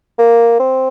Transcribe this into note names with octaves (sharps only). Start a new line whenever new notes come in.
A#3
C4